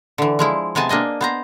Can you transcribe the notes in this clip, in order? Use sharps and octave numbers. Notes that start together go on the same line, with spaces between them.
D3 E3
F3 G#3 E4
C3 G#3 B3 G#5 A5
A#3 D4 D#5 G#5
B3 C5 A#5